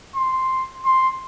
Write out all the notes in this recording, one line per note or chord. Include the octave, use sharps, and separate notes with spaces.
C6
C6